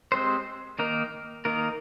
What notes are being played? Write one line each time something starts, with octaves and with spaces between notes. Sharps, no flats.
G#3 C4 G4 C5
D#3 A#3 D#4 A#4
D#3 A#3 D#4 A#4